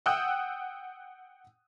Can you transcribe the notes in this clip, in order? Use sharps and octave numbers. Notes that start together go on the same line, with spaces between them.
F#5 G5 D#6 E6 F#6 G6